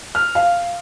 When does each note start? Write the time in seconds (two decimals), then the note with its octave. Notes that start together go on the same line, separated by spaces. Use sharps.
0.15 F6
0.35 F5